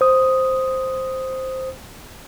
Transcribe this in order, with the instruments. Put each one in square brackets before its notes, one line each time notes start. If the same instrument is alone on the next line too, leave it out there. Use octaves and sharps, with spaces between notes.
[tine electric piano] C5 D#6